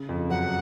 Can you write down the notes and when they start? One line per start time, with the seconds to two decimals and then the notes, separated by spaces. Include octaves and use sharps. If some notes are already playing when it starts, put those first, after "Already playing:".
Already playing: C#3
0.09 F2 F3
0.30 F#2 F#3 F#5